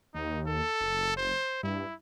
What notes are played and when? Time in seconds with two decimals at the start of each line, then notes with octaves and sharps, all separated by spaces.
0.15 D#2 D#4
0.47 A4
0.81 F#1
1.17 C5
1.63 G2 E4